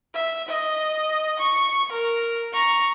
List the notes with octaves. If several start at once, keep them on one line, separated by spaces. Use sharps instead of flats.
E5
D#5
C#6
A#4
A#5 C#6